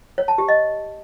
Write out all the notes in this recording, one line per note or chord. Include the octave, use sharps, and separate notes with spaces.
C#5
A5
G4
D#5